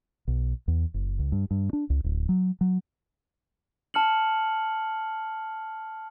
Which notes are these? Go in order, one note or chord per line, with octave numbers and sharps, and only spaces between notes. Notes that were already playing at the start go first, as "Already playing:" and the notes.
B1
E2
F#1
C#2
G2
G2
D4
C#2
D1
F#3
F#3
A5 F6 C#7 F#7